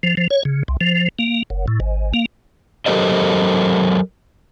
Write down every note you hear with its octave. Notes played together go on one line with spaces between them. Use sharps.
F3
F3
C#5
C#3
C2
F3
A#3
F#1
A2
G#1
A#3
F#3 G4 A4 A#4 C5 D#5